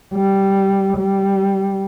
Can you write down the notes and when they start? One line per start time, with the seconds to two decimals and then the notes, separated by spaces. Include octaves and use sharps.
0.14 G3
0.98 G3